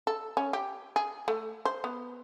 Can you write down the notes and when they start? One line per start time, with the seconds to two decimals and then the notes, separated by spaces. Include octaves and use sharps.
0.07 A4
0.37 C#4
0.53 G4
0.96 G#4
1.28 A3
1.65 C5
1.84 B3